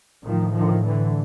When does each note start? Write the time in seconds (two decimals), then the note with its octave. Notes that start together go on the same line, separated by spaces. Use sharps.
0.25 A2 D#3 F3
0.54 D#3 F3
0.83 D3 E3